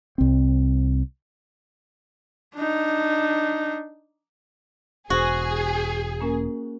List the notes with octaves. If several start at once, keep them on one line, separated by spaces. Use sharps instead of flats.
C2 C4
D4 D#4
E1 F#4 G#4 C5
A#3 C#4 A#4